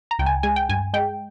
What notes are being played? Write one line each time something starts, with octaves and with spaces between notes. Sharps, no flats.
A#5
C#2 G5
G#5
G#3 G#5
G5
G2 G#5
G#3 G5